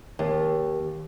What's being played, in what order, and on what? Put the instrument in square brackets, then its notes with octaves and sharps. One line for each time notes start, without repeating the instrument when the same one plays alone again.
[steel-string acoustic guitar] D#2